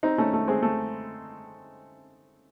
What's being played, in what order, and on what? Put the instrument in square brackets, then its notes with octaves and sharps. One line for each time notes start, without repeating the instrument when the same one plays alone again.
[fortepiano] C4 D#4
A3 C#4
A3
G#3 C4
A3